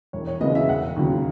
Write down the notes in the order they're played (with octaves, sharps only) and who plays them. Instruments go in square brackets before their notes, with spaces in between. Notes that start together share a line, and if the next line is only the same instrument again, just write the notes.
[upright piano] E1 C#5
C#5
E2 C#3 G#3 B3 D#5
E5
E1 F#5
D#2 C#3 F#3